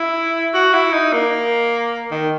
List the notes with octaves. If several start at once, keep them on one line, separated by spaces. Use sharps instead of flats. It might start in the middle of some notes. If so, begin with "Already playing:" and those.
Already playing: E4
F#4
E4
D#4
A#3
D#3